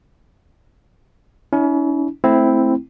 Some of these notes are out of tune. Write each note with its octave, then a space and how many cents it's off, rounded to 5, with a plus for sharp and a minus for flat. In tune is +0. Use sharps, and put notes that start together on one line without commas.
C#4 +35 E4 -35
A3 -5 C4 +0 E4 +0